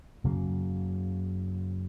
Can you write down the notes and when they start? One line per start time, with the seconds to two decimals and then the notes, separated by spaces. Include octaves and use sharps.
0.24 F#2 C#3 F#3 A#3